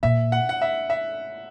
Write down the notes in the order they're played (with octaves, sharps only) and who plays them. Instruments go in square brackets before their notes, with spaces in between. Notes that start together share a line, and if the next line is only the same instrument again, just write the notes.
[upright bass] A#2 [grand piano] E5
[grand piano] F#5
F#5
E5
E5